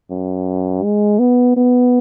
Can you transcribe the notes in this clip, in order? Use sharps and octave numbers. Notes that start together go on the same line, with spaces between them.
F#2
G#3
B3
B3